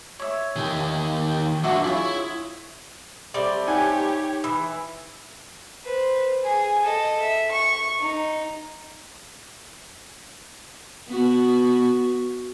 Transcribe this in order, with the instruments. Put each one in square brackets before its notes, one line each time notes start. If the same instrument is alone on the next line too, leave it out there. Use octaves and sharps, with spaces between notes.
[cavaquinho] C#5 E5
[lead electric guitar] D#3 G4
[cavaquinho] G5
[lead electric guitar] F#3 D4 [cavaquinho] F#4 E5 C#6
[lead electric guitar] E4 [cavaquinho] F4 G#4 C#5
[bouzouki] G3 A3 C4 [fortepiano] D5
[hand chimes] D#4 [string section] G4 C#5 [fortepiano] F#5 G#5
[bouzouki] E3 [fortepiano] E6
[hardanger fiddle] B4 C5
G#4 G#5
A4 D#5
E5
C#6
D#4
[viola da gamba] B3 F#4